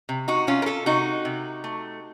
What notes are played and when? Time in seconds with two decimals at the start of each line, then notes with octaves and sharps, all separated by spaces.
0.09 C3
0.28 D#4 F#4
0.47 C3 C#4 F4
0.62 A#4
0.66 F4 A4
0.86 C3 D#4 F#4
1.25 C3
1.64 A3